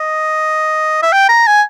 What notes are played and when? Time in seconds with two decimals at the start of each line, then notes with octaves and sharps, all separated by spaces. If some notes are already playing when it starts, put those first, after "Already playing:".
Already playing: D#5
1.02 E5
1.12 G5
1.29 A#5
1.47 G#5